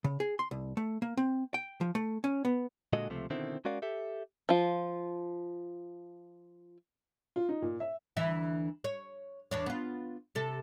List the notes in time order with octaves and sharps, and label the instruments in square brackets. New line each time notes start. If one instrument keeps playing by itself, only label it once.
[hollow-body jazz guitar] C#3
G#4
C6
C2
A3
A#3
C4
G5
F3
A3
C#4
B3
[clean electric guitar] A#2 D3 G#3 F#4 A4 D#5
C#2 C3 F3 A3
B2 D3 D#3 C4 E4
G#3 C#4 F#4 A#4 D5 F5
G4 A4 E5
[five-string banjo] F3 F4
[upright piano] F4
D#4
A#2
E5
[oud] D2 E3 E5
C#5
E2 D4 C#5
B3 F4
C3 A4